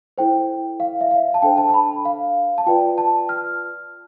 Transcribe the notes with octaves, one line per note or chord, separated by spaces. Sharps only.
E4 A4 C5 G5
F5
E5
F5
A5
D4 A4 C5 G5
A5
A5
B5
F5
A5
F4 B4 D5 G5
A5
F6